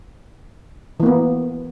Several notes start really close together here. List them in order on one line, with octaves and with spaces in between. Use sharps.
E3 A#3 B3